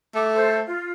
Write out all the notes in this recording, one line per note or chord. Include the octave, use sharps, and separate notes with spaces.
A3 D6
A4 C5
F4